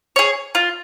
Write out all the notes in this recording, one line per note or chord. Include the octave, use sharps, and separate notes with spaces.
G#4 C#5
F4